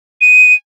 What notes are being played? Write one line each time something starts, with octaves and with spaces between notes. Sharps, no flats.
D#7